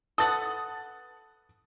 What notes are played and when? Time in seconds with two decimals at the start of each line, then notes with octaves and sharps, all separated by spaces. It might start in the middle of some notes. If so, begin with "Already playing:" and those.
0.18 A4 B4 F#5 D#6 A6